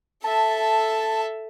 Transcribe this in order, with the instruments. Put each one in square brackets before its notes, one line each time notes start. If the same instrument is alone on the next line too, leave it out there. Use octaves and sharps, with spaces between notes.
[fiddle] A4 E5 [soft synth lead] A5